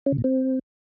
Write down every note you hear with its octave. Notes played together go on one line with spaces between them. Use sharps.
C#4
C#3
A#2
C4